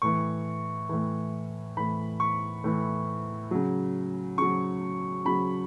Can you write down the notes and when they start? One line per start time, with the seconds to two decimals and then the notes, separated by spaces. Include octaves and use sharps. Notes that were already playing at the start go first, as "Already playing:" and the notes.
0.02 A2 E3 C#6
0.89 A2 E3
1.77 A2 E3 B5
2.20 C#6
2.64 A2 E3
3.51 C#3 F#3
4.38 C#3 F#3 C#6
5.25 C#3 F#3 B5